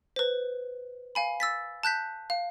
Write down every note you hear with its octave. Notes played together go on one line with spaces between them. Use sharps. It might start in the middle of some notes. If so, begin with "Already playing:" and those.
B4 C5
F5 G#5 B5
E6 A6 B6
A5 F#6 G6 B6
F5